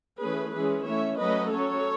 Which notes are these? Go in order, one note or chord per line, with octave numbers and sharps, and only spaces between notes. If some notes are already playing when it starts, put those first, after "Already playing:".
E3 A3 C#4 G#4 B4
E3 G#3 C#4 G#4 B4
E3 A3 C#4 C#5 E5
F#3 A3 C#4 B4 D#5
F#3 C#4 A4 C#5